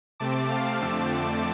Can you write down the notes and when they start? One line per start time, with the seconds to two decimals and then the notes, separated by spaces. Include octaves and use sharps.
0.20 C3 A3 C4 A5 D6
0.49 F5 A5
0.79 F2 D3 A3 C4 A5 D6